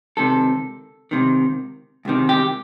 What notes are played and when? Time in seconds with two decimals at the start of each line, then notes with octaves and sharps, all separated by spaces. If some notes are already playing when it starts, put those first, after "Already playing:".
0.17 C#2 C3 D#3 A4
1.11 C#2 C3 D#3
2.05 C#2 C3 D#3
2.29 G4